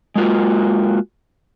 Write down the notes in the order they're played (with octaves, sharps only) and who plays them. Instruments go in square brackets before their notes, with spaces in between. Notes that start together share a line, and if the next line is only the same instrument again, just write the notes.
[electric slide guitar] G#3 A#3 F4 F#4